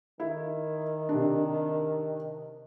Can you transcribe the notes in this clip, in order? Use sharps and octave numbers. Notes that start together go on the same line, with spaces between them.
D#3 E4
C3 D4